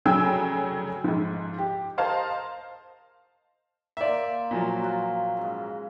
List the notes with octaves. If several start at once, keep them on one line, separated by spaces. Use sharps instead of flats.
F1 C#3 F#3 G5 G#5 E6
G#2 F3
G4
A#4 C5 D#5 F5 A5
A#3 C5 D5 E5 C6
A#2 F3 F#3
F4 F#4
G#2 C#3